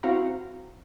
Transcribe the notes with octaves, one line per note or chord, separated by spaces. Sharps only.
C4 E4 F#4 F5 F#5 A#5